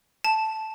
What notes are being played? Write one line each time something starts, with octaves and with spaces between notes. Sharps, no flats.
A5